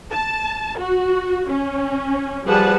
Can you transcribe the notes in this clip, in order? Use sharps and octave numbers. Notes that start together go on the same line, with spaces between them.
A5
F#4
C#4
F3 G3 G#4 B4 F#5 A5